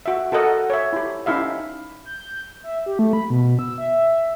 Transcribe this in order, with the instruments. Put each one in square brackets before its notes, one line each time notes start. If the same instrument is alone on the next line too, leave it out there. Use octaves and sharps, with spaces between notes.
[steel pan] F#4 E5
F#4 A4 A#4 D#5 F#5
C#5 E5
E4 G4
C#4 D#4 E4 G4 E5 F5
[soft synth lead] G6
E5
G4
A3
B5
B2
E6
E5